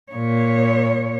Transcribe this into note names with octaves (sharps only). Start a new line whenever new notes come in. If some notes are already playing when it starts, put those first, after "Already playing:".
A#2 C#5